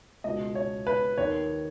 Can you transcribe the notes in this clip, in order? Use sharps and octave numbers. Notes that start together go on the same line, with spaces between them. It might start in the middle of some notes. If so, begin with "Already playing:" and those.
C#2 B2 D#5
C#5
B4
D#2 D#3 C#5